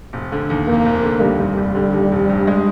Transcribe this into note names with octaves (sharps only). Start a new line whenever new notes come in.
F1
D3
D#2
F1 A#3
F1
D3
D#2 G3
F1
F1
D3
D#2
F1
G2
G#3